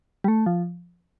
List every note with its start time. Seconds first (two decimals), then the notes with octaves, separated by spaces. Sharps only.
0.24 G3
0.28 A3
0.46 F3